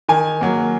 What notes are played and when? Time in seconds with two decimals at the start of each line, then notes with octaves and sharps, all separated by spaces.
0.09 D#3 G#5
0.41 F#3 A#3